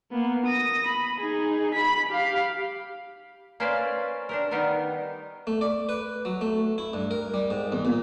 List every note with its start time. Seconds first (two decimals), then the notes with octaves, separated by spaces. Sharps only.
0.12 A#3 B3
0.46 D#6 A#6
0.87 B5
1.20 D#4 G#4
1.74 B5 B6
2.09 G4 F5
3.60 A#3 C#4 B4 C5 D5 F5
4.29 D4 G4 A#4
4.51 D#3 G3 B3 D#4 A#4
5.47 A3
5.61 D5
5.89 B4
6.25 F#3
6.41 A3
6.78 E4
6.93 G2
7.11 A#4
7.34 G3
7.50 G#2
7.72 E2
7.85 A#2